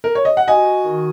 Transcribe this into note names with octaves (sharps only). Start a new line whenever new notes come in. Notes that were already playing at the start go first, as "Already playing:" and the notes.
A#4
C#5
D#5
F#5
F#4 D#5 G#5
D#3